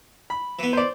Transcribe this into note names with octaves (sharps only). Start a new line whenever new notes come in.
B5
E3 B3
C5 D5